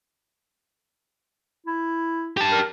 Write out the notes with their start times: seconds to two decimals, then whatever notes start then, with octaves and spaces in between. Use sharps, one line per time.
1.66 E4
2.37 G4 A5
2.51 A#4